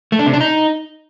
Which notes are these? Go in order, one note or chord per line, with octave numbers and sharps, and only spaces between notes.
A3
D4
C3
D4
D#4